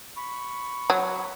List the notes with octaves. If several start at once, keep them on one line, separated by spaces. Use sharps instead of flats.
B5 C#6
F#3